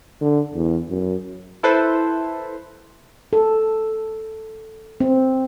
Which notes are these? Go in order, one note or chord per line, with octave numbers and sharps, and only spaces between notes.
D3
E2
F#2
E4 A4 B4 C5
A4
C4